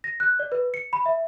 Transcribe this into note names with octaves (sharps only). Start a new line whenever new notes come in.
A#6
F#6
D5
B4
C#7
B5
E5